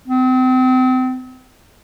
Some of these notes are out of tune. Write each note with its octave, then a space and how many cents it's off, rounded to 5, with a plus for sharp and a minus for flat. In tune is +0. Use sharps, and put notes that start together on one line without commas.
C4 -35